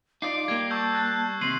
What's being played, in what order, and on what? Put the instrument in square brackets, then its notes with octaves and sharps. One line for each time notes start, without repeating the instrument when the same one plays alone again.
[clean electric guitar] D#4 F4 D5 [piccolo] D6 [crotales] C7
[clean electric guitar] G3 A#3 [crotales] G#6
[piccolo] A5 [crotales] C#6 E6 G6
[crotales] F#6 G#6
[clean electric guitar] D#2 C3 [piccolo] C6 [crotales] C7 D#7 F#7